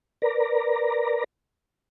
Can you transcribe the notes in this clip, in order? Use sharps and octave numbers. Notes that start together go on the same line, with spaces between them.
A#4 B4 D5 A#5